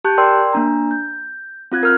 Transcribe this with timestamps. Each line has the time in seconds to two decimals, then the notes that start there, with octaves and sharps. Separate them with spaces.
0.04 G4 A5 F#6 G6
0.18 A#4 D5 G5 C6 E6
0.53 A#3 D4 A#5
0.91 G6
1.72 C4 F4 F#6 G#6
1.83 A#4 F6 F#6